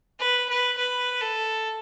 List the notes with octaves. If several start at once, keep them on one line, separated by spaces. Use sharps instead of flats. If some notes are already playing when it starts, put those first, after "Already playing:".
B4
B4
B4
A4